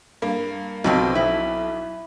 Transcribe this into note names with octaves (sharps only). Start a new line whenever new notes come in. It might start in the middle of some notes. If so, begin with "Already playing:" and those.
G2 A#3
B1 B2 F3 C4
E4